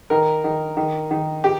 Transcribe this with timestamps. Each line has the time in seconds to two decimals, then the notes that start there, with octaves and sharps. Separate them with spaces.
0.10 D#3 A#4
0.44 D#3
0.77 D#3
1.11 D#3
1.44 G4